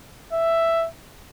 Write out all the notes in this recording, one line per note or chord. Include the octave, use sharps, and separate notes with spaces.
E5